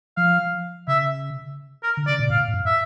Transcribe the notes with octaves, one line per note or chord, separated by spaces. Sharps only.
F3 F5
C#3 E5
A#4
D3
C#3 D5
A#2
A2 F5
A2
G2
E5